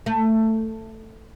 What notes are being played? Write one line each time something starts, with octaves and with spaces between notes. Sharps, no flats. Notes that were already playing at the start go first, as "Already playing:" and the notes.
A3